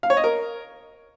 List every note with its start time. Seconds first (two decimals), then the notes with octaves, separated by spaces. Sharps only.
0.03 F5
0.10 C#5
0.17 D#5
0.24 A#4